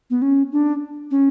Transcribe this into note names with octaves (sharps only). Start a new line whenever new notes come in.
B3
C#4
D4
C#4